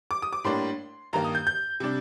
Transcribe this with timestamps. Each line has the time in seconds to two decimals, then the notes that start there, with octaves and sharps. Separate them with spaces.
0.11 D6
0.22 D#6
0.33 D6
0.44 A2 G3 A#3 D4 C6
1.13 G2 D#3 A#3 A#5
1.24 D#6
1.35 G6
1.47 G6
1.80 C3 G3 D4